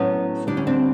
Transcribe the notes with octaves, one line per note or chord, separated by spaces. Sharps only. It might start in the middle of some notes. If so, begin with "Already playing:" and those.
Already playing: A2 F#3 A3 B3 C#4
D2 D3 G3 D4
C#4
C4 D4